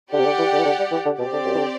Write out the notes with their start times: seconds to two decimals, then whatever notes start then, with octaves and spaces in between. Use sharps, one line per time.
0.13 D3 G4 D5 F#5
0.19 C3
0.25 D3
0.39 E3
0.52 D3
0.59 E3
0.65 D3
0.79 G3
0.92 E3
1.05 D3
1.18 B2 C4 G4 D5
1.33 D3
1.45 F#2
1.55 E3
1.58 D3